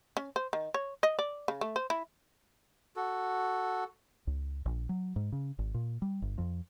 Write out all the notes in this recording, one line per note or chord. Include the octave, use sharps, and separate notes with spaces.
C#4
C5
D#3
C#5
D#5
D5
C#3
A3
C5
E4
F#4 A4
C#2
A#1
F#3
G#2
C#3
G#1
A#2
G3
G1
F2